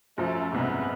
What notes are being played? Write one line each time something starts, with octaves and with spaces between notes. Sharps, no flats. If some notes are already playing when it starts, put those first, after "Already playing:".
F#2 F3 A3
F#1 C2 G#2 B3